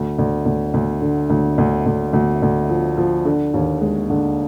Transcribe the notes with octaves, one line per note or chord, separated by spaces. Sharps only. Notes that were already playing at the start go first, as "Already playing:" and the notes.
Already playing: D2
D2
D2
D2
D3
D2
D2
D2
D2
D2
F3
F3
D3
D#2
G#3
D3